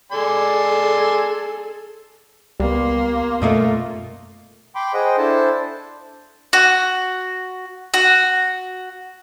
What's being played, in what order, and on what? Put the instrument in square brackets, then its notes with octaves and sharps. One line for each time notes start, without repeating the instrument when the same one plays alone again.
[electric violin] G#4 A4 [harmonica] D5 G#5 C6
[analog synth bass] C#2 [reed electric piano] G3 B3 [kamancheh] A#3 C6
[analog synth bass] F#2 [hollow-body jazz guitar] B2 A3 A#3 [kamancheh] F4
[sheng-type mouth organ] G5 B5 C6 D6
G#4 C5 D#5 F#5 G5
D4 E4 A4 C5 A5
[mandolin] F#4
F#4